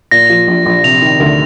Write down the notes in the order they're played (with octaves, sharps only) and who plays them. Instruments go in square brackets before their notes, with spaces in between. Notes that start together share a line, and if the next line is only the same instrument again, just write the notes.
[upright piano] A#2 [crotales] A#6
[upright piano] F3
A#1
A#1
[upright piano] C3 [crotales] F7
[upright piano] D#3
D2